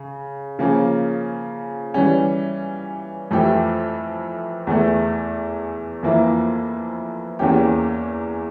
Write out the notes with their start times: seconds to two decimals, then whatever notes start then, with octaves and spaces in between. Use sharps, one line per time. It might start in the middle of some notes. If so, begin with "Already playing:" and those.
Already playing: C#3
0.59 C#3 F3 A#3 C#4
1.94 E3 G3 C#4
3.31 F2 E3 A3 E4 G4
4.67 E2 E3 A3
6.03 F2 E3 A#3 E4
7.39 E2 E3 A#3 C#4 G4